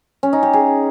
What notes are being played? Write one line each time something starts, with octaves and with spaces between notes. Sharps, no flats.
C#4
D#4
G4
G#4